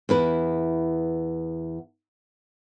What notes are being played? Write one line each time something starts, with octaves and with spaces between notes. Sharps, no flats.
E2 E4 B4